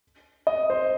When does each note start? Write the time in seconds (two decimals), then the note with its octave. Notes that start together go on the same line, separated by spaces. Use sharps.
0.47 D#5
0.70 C5